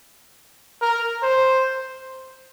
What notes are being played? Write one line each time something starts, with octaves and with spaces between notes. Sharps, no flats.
A#4
C5